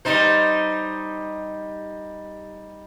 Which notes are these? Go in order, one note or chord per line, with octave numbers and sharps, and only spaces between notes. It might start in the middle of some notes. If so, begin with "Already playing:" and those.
G3 D#4 C5